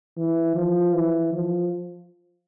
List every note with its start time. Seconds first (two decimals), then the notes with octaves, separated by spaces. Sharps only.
0.17 E3
0.56 F3
0.94 E3
1.33 F3